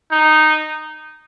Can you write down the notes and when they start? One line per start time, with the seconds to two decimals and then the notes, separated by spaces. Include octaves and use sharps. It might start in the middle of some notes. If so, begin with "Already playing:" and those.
0.12 D#4